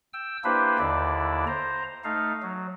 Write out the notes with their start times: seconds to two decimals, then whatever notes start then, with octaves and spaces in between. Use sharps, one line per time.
0.14 G5 E6
0.44 A#3 D4 E4 G4 B4 C5
0.79 D#2 D3 E4 D5
1.47 C5 A#5
2.04 A3 D#4 F5
2.43 F#3